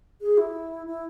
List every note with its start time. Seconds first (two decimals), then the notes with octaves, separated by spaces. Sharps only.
0.21 G#4
0.38 E4
0.87 E4